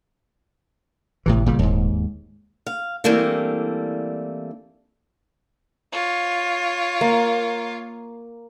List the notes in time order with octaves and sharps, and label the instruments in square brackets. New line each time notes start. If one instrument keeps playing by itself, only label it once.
[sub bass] G#1 [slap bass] A2 C3 E3
[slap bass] A#2 C#3 G3
[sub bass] D#1 [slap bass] D#2 G#2
[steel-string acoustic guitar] F5
E3 G3 A3 A#3 C4 D4
[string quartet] F4 C#5
[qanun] A#3